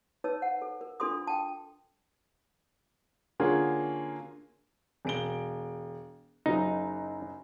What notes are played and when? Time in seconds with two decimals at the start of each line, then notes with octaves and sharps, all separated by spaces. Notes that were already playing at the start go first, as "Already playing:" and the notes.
0.24 D#4 B4 C#5 A5 E6
0.40 C5 F#5
0.62 A4
0.81 A#4
1.00 D4 F4 A4 C6 D#6
1.27 G5 A5
3.40 D3 A#3 C#4 F4 F#4 G#4
5.05 E1 D7 G7
6.46 F#1 F#3 D#4